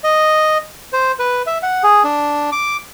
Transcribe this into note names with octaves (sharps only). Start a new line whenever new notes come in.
D#5
C5
B4
E5
F#5
G#4
D4
D6